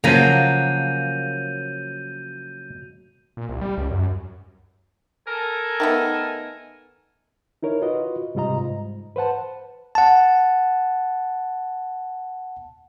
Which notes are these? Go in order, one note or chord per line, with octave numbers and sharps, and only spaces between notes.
C#3 F3 F#3 A#3 G6 D#7 F7
A#2
C2
G3
C#2
F#2
A4 A#4 G#5
D#3 A3 B3
D#4 E4 A#4 C#5
F4 F#4 B4 D#5
G#2 C3 G3 F4 D#5 A#5
G#2
B4 C5 F#5 A5
F#5 A5